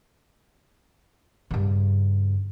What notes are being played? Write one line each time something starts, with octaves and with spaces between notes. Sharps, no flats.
G2 C#3